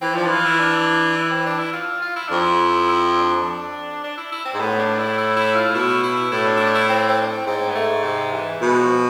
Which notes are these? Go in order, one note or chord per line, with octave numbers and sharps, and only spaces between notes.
E3 C4
F3 D4
E3 F4
E4
D4
E4
C4
D4
E4
F4
F4
E4
F2 D4
E4
E4
D4
D4
E4
E4
C4
G#2
A2 B3
D4
E4
E4
E4
F4
A2
B2 E4
E4
A2 E4
D4
E4
D4
E4
C4
C4
D4
C4
G#2 C4
B3
A3
C3
E3
B2
G#3
F3